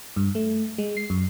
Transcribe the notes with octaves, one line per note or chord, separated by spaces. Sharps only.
G2
A3
G#3
C7
F#2